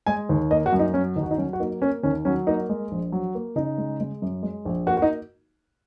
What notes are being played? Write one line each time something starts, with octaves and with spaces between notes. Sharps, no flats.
G#3 G#5
D#2
A#3 D#5
F#4
F#2
D#4
F#3 C#4
D#2 D#4
F#4
D#4
F#3 C#4
F#4
A#3 D#4
A#3 C#4
D#2 C#4
F#3 C#4
A#3 D#4
G#3
A#1
F#3
A#3
C#3 D#4
G#3
G#3
F#2
G#3
A#1
A#3 F#4
F#4
D#4